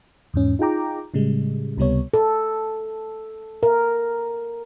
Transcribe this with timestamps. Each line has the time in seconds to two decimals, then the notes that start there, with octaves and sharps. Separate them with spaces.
0.34 E2 G#2 C#4
0.59 D#4 F4 G#4 G5 A#5 D6
1.14 A2 C#3 G3 G#3
1.77 C#2 C3 G3 B3 C#5
2.14 A4
3.63 A#4